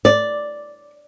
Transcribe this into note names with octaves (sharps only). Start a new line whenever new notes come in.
D5